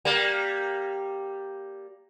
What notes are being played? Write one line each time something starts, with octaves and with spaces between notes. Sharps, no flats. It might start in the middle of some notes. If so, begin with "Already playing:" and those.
G3 A#3